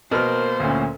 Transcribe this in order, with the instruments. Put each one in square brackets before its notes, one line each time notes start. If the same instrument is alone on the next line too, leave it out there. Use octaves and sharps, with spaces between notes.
[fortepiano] B2 F6 [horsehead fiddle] A#3 C5 [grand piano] A#4
[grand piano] D2 A#2 C#4